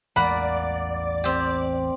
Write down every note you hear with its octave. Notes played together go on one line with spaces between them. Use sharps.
A1 E2 G#3 A#3 D5 F#5 B5
C4 G4